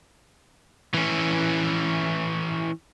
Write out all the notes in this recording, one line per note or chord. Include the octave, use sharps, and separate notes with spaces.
E3 C#4